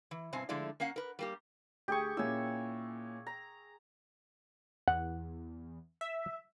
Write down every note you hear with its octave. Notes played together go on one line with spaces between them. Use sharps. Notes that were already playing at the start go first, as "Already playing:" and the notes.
E3
G2 B2 C4 G#5
D3 F3 G#3 A3 E4 D5
A#3 C#4 F5 F#5
A#4 B4
G3 A#3 G4
D2 G4 G#4 C#6
A#2 C#4 E4 G#5 E6
A#5
E2 F#5
E5